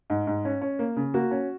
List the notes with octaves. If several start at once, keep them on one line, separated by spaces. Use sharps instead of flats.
G#2
G#2
C#4
C#4
A#3
C#3
A#3 F#4
C#4